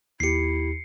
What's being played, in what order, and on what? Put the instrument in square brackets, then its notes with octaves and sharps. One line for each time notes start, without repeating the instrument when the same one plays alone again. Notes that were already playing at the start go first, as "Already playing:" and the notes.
[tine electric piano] D#2 G4 [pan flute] E4 [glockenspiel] C7 C#7